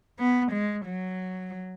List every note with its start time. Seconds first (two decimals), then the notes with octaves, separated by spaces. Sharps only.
0.19 B3
0.52 G#3
0.86 F#3